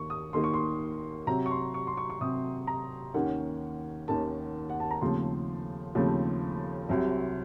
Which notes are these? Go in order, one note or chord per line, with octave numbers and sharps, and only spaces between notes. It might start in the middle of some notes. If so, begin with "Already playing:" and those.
Already playing: D#2 D#3 A#3 C#6
D#6
D#2 D#3 A#3 C6
C#6
C6
C3 F#3 C4 A#5
C#6
C6
C#6
C6
C#6
C#6
C3 F#3 C4 D#6
A#5
D#2 D#3 A#3 C#4 F#5
D#2 D#3 A#3 C#4 A5
F#5
A5
A#5
D#2 C#3 F3 A3 C4 C6
D#2 C#3 F3 A3 C4
C2 C3 F#3 C4